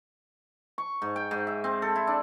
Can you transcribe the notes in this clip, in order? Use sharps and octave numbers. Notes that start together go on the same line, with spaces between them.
C#6
G#2
G5
G#2
E5
C4
A4
E4
D4